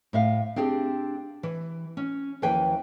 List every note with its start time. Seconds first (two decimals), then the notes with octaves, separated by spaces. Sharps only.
0.13 A2 E5 F5
0.56 C4 D4 G4 G#4
1.43 E3
1.97 C#4
2.42 D#2 E3 F3 B4 G5 G#5